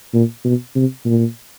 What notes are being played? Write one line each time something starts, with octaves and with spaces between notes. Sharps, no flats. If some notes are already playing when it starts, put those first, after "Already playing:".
A#2
B2
C3
A#2